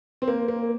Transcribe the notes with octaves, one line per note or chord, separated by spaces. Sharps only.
C4
A#3
A#3